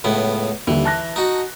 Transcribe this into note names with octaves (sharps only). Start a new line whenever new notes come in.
C#2 A2 B3
D#2 D3 E3 G3
A5 F#6 A#6
D#4 F#4